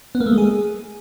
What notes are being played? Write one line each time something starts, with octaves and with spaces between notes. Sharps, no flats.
B3
A#3
A3
G#3
G#4